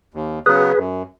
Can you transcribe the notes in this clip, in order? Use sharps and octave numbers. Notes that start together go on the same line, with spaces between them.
D#2
C#3 F#3 B3 G#4 B4
F#2